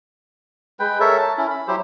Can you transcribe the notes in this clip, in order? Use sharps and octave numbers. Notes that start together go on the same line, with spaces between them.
G#3 B4 G5
A4 A#4 C#5 E5
A5
C#4 E4
B5
F#3 E4 G4 C5